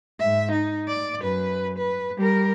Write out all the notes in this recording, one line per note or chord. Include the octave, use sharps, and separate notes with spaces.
G#2 E5
D#4
D5
F#2 B4
B4
G3 A#4